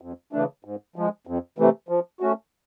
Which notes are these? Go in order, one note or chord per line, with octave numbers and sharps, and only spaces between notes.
F2
C#3 E3 A3 D4
G#2
F3 G#3
F2
C3 E3 A3
F3
A3 C#4 F#4